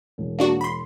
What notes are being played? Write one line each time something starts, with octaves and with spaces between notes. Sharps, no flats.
E1
A#3 D4 F#4
B5 C6